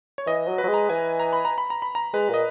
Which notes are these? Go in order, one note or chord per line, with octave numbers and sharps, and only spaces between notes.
C#5
E3 D#5
F#3
B4
F#3
G#3
A#5
E3 G#5
A#5
B5
A#5
B5
A#5
B5
A#5
G#3 B4
A#2 D#5